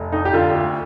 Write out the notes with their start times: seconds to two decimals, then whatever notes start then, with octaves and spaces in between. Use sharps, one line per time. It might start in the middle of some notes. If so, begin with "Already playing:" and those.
Already playing: F1
0.12 F2 D#4
0.25 G4
0.33 D3 F4
0.56 D2